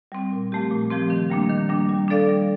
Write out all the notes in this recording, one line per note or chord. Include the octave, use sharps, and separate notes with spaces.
G3 C4
A#2
F3 A3 C4 G4
A#2
F3 A3 C4 G4
D#3
G3 A#3 D4
D#3
G3 A#3 D4
G3
D4 A4 D5 F5
G3